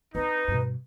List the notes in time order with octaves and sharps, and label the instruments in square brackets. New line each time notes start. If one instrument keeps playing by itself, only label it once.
[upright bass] C4 D4 [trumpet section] D#4 [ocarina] B4
[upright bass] G2 B2